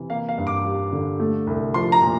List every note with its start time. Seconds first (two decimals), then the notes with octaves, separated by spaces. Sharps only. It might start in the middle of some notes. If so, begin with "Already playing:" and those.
Already playing: C3 E3
0.10 A#3 F5
0.29 F5
0.38 G2
0.47 D6
0.65 G3
0.92 D3
1.20 A3
1.47 C2
1.74 F3 C6
1.92 A#5
2.02 A#2